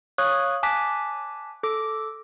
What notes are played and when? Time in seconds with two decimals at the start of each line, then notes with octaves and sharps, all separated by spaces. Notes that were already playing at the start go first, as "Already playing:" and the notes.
0.18 C#5 F5 C#6 D#6 F#6
0.63 G#5 A5 D6 F#6 B6
1.63 A4 D6